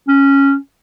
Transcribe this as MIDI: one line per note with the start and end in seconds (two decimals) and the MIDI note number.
0.08 0.54 61